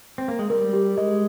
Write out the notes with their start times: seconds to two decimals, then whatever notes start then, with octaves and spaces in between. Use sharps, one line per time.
0.18 C4
0.28 A#3
0.39 G#3
0.50 G3 A#4
0.73 G4
0.97 G#3 D#5